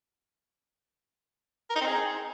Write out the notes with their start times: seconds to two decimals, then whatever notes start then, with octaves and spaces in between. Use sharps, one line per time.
1.70 A#4
1.75 D#4
1.81 C4
1.87 G#4